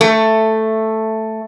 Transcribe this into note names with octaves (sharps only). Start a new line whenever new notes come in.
A3